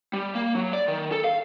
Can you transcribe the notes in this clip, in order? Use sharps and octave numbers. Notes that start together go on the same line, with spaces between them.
G3
A#3
F#3
D5
D#3
A4
F5